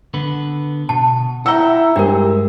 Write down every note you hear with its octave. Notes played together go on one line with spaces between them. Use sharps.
D3 B3 B4
B2 A5
E4 F#5 G5 A#5 E6
G2 G#3 D4 G4 A#4